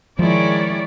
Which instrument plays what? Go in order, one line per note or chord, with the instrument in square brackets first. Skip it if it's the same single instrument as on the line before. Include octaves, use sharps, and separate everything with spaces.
[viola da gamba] D#3 G#3 E4 [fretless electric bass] F3 [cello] C#5 D5